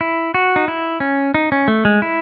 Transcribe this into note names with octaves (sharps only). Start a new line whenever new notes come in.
E4
F#4
D#4
E4
C#4
D#4
C#4
A3
G#3
E4